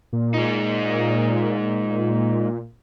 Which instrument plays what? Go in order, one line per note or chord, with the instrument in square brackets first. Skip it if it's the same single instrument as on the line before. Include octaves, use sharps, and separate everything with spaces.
[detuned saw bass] A#2
[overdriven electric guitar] G#3 D#4